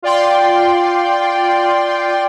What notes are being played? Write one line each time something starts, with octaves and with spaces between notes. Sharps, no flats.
F4 D5 G5 C6